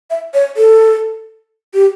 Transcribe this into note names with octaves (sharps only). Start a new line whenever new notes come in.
E5
C#5
A4
G4